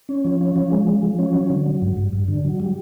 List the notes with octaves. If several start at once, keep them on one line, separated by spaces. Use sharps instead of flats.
C#4
F3
C#4
F3
G#3
F3
F3
C#4
F#3
D3
F#3
G2
G2
G2
D3
F#3
G3